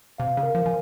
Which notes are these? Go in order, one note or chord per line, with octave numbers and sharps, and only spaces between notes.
C3 F5
C#3
A#4
F3
F3 G#5